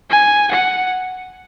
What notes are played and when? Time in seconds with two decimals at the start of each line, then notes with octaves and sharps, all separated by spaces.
0.10 G#5
0.51 F#5